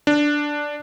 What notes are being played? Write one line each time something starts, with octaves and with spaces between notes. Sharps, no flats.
D4